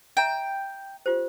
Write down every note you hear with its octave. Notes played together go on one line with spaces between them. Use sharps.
E5 G5 A#5
F4 G4 C5